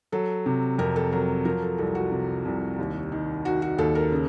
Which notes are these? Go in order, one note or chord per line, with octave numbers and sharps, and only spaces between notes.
F#3 A4
C3
F2 A#4
A4
F#3 A#4
F3 A#4
A4
C2 A4
F#4
C3
C2
D#2
D#3
D#3 F#4
F#4
D#2 A4
A#4
C#3